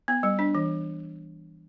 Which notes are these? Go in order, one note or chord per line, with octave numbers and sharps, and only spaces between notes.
B3
G3
D4
E3